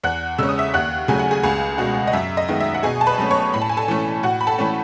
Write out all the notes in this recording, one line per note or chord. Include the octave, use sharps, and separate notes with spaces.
E2 F#5 F#6
C#3 G#3 C#4 E6
D#6
E5 E6
D#2 F#5 F#6
C#3 F#3 A3 G#5
F#5
G#4 G#5
C#2 G#4 G#5
B2 G#3 F#4 F#5
D#5
F#2 E5
D#5
D#3 G#3 B3
E5
F#5
B2 G#4 G#5
A5
B4 B5
F#3 A3 C#4
C#5 C#6
A2 B5
A5
G#5
A4 A5
E3 A3 C#4
A2 F#4 F#5
B5
A4 A5
E3 A3 C#4